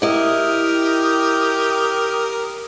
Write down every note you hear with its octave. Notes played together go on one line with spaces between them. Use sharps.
E4 G4 A#4 D#5 D#6